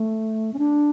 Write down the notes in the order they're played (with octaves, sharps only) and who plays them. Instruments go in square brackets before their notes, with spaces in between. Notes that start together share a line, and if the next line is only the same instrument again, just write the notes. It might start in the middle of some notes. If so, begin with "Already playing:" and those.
Already playing: [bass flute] A3
C#4
D4